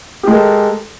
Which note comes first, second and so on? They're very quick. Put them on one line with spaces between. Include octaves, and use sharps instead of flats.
G4 G#3 A#4 A4